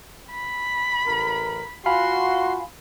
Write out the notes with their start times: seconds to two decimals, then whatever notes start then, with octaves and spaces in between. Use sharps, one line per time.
0.32 B5
1.07 A1 A#4
1.86 F4 F#4 F5 G#5 B5 C6